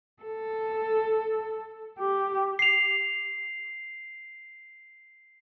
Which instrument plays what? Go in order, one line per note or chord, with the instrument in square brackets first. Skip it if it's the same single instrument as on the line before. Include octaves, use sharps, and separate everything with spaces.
[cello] A4
G4
[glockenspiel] C7 F7